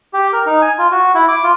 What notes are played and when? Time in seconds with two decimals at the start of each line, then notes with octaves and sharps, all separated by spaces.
0.13 G4
0.33 A#4
0.46 D#4
0.62 G#5
0.78 F4
0.92 F#4
1.14 E4
1.28 D6
1.44 F4